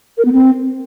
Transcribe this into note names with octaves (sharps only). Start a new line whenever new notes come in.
A#4
B3
C4